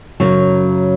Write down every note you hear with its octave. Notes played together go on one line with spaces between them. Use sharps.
F#2 C#3 F#3